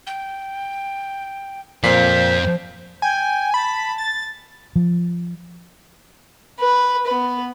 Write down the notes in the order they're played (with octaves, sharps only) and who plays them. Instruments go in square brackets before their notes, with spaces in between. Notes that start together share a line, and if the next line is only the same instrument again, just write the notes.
[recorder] G5
[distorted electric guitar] F2 F5 [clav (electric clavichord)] A#2 [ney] C5 [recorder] B6
[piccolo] G5 [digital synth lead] G#5
[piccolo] A5 [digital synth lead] B5
[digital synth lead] A6
[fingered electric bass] F3
[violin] B4
B3 B4